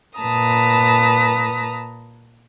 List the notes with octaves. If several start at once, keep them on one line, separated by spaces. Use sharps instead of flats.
A#2 B4 A5 A#5 D#6